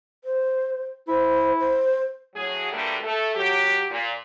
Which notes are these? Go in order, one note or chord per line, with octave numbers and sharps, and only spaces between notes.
C5
E4 C5
C5
A2 F#3 G#4
B2 D3 G3 A3 A#3 D4
A3 A4
F#3 G4
A#2